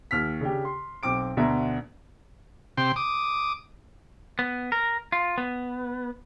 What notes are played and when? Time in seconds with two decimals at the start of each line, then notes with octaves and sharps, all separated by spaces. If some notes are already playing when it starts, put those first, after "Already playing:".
0.11 D#2 F6 B6
0.41 C#3 D4 G4
0.65 C6
1.03 B1 C4 D6 D7
1.37 D2 B2 D4 E5 A#5
2.77 C3 G5 C6
2.96 D6 D#6
4.39 B3
4.72 A#4
5.12 F4
5.38 B3